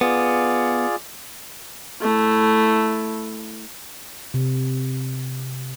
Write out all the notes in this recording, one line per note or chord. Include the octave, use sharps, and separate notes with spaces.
B3 F4 G#4 D5
A3 E4
C3